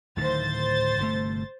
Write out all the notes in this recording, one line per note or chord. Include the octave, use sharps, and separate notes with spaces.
D1 A2 D#3 C5 A6
G1 C3 A3